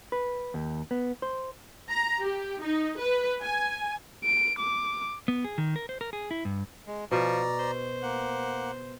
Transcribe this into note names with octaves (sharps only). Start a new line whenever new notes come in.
B4
D#2
B3
C5
A#5
G4
D#4
B4
G#5
D7
D6
B3
G#4
D#3
A#4
C5
A#4
G#4
E4
G2
G#3
B2 F3 D5 A#5
C5
A#3 F#5